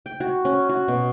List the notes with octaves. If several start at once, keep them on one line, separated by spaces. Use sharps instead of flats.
G5
F#4
C#4
F#4
B2